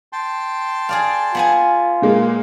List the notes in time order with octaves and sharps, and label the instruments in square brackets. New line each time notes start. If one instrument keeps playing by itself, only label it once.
[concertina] G5 A5 C6
[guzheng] G#4 D5 F5
[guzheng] B3 G#4 G#5 [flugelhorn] F4
[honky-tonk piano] A#2 G#3 A#3